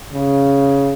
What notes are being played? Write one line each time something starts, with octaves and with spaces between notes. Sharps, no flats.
C#3